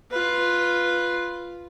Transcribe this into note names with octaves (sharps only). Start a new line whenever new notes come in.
F4 B4